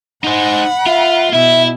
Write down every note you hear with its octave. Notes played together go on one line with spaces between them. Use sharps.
D#4 C5 F#5 B5
F4 E5
B2 E4 E5